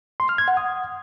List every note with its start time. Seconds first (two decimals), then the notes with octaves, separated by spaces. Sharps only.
0.20 C6
0.29 F6
0.38 G#6
0.48 F#5
0.57 D#6